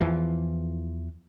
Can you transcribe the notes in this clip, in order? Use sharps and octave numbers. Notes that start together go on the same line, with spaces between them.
E2 E3 F3